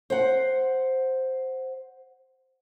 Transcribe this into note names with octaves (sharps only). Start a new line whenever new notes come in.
C5 F#5